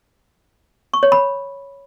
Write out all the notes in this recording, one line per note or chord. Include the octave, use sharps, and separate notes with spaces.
C#6
C#5
B5